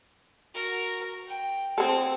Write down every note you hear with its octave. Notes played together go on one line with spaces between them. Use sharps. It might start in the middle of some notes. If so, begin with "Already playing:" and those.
F#4 A#4
G5
C4 G#4 A4